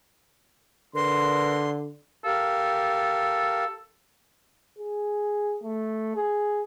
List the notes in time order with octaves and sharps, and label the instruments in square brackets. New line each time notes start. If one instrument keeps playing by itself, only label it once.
[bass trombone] D3 [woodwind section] A#4 B4 C6
[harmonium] G4 A#4 F5 [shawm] A4
[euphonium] G#4
A3
G#4